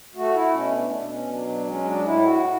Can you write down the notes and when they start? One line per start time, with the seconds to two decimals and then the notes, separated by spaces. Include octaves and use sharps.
0.15 A3 F#4
0.34 E4
0.53 B2 C#4
0.72 D4
0.85 C#4
0.90 B2 D4
1.10 C#4
1.29 F#3 D4
1.48 D4
1.67 G#3 C#4
1.85 D4
2.04 A2 E4
2.24 F#4
2.42 A2